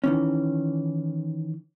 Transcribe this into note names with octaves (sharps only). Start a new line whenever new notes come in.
D#3 E3 C#4